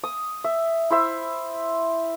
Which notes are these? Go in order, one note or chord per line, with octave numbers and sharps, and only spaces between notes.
D#6
E5
E4 C5 E5